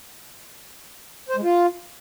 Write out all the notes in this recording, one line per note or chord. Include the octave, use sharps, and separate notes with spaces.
C5
G#3
F4